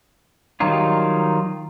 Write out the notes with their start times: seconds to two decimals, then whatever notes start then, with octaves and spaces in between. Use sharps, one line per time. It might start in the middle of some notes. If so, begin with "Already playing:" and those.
0.60 D#3 F#3 G3 D#4 F4